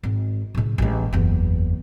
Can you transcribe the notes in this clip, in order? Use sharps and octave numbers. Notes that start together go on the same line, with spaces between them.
G#1
A2 C#3
A1 G#3
F#1 E2